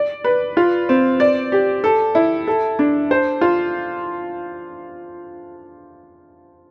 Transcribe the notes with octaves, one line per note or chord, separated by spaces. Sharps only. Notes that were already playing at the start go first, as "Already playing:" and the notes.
Already playing: D5
B4
F4
C4
D5
G4
A4
E4
A4
D4
C5
F4